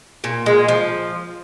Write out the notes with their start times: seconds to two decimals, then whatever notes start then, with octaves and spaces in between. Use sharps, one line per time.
0.24 A#2
0.46 G#3
0.68 F3